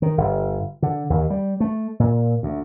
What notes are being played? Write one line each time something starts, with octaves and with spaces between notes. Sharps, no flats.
D#3
G1
D3
D#2
G3
A3
A#2
D2